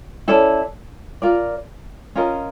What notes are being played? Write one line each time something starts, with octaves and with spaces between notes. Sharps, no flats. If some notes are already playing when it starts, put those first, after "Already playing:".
C#4 E4 A4 D5
F4 A#4 D5
C#4 F4 A#4 D#5